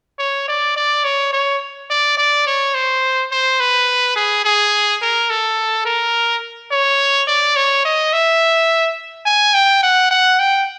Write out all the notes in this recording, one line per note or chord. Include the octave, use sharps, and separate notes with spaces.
C#5
D5
D5
C#5
C#5
D5
D5
C#5
C5
C5
B4
G#4
G#4
A#4
A4
A#4
C#5
D5
C#5
D#5
E5
G#5
G5
F#5
F#5
G5